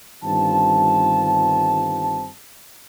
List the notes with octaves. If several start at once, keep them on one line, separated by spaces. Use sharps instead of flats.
G1 G2 D#3 C4 F4 A5